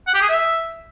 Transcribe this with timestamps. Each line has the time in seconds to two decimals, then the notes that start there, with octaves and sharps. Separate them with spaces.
0.07 F#5
0.14 G4
0.22 G#4
0.29 E5